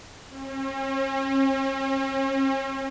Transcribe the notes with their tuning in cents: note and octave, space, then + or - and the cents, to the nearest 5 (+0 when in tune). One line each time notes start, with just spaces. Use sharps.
C#4 -45